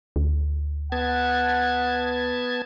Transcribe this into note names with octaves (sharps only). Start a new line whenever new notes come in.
D2
B3 F#5 A5 G#6